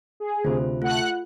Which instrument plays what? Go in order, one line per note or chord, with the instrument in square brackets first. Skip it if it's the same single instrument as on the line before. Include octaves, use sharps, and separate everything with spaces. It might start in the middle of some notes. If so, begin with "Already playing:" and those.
[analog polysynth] G#4
[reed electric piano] D2 C3 [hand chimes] F4 C5
[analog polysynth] A3 F#5 F#6 [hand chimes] F4